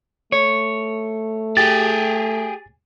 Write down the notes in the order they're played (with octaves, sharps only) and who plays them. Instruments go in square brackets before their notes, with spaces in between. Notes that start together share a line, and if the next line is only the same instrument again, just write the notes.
[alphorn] A3 [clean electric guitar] C#5
[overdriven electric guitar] G4 G#4 [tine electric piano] A6